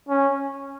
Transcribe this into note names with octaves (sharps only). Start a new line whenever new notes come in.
C#4